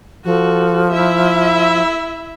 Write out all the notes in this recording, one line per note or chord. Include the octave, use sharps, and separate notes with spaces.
F3 F#4 A4
E4 E5